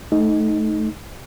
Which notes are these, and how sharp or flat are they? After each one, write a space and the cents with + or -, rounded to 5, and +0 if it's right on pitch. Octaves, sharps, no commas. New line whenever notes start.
A3 -15 D#4 +0